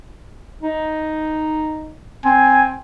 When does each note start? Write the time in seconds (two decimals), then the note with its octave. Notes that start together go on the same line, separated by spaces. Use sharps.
0.63 D#4
2.25 C4 G#5